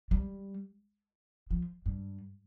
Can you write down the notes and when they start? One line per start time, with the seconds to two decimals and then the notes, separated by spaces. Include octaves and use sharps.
0.11 G3
1.50 F3
1.86 G2